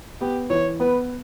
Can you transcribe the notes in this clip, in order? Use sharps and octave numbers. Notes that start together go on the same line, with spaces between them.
B3 G4
E3 C#5
B3 B4